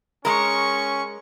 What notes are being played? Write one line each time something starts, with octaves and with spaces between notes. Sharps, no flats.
G#3 C#4 A#4 C#6